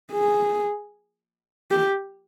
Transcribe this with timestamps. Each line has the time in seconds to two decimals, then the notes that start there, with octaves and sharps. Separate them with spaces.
0.12 G#4
1.71 G4